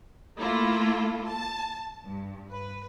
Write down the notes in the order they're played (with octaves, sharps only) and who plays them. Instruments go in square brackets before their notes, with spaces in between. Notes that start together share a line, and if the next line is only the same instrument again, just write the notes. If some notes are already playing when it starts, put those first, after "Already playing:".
[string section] A3 A#3 E4 F4 A4
A5
G2
B4